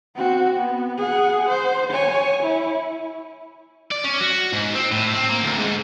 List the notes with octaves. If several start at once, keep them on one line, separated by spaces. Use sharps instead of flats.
C4 F#4
B3
G#4 F#5
C5
C#5 G#5
E4
D5
C#4
F#4
G#2
C4
A2
C4
A#3
D2
G#2